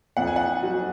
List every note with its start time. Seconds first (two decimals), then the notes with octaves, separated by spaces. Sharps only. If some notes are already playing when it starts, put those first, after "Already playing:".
0.17 F2 F#5
0.27 G#5
0.36 F#5
0.63 F#3